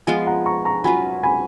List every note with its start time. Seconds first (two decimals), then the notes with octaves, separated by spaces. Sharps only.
0.07 F3 G#3 B3 F4 F5 G#5
0.27 F#5 A#5
0.46 A#5 C#6
0.65 A#5 C#6
0.84 F#3 C#4 F4 B4 G#5 B5
1.23 G#5 B5